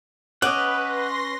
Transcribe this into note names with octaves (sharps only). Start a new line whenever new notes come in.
C#4 B4 D#5 F#5 D6
C6 A#6